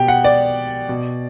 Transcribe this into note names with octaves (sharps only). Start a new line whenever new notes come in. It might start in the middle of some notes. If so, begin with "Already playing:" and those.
Already playing: B2 G4 G5
F#5
D5
B2